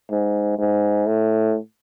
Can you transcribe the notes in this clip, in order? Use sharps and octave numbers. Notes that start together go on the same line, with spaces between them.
G#2
G#2
A2